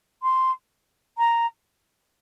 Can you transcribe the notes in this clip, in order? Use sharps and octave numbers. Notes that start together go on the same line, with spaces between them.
C6
A#5